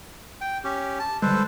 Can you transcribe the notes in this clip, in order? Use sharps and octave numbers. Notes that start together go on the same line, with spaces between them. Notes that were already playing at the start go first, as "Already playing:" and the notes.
G5
C#4 G4
A5
D3 G3 G#3 A4 B4 C5